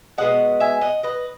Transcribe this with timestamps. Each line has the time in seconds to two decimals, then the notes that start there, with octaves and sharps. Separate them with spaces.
0.18 B2 G#3 B3 D#5 F#5
0.60 E5 G#5
0.81 D#5 F#5
1.03 B4 D#5